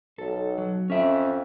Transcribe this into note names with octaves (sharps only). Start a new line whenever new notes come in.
B1 A4
F#3
F2 C#4 E5